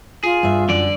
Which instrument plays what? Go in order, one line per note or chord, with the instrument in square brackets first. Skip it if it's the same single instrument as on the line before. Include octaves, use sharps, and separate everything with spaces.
[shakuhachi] F4 [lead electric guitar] G#4
[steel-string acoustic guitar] G2 E5
[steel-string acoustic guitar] F#2 [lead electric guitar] D3 D5